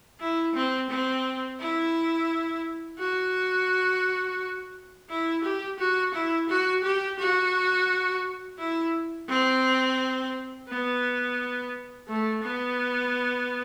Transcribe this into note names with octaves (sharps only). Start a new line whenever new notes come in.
E4
C4
C4
E4
F#4
E4
G4
F#4
E4
F#4
G4
F#4
E4
C4
B3
A3
B3